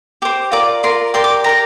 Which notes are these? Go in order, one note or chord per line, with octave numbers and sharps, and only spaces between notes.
G4 C5 D6
F4 A#4 D5 D6
F4 A#4 D5 C6
G4 A#4 D5 C6
D6
G4 A#4 D5 A#5